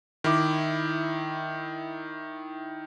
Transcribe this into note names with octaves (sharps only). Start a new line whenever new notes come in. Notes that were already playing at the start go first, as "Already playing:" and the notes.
D#3 E4 D6